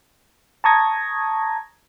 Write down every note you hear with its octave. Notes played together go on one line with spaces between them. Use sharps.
A5 A#5 C#6 D#6 G#6 A#6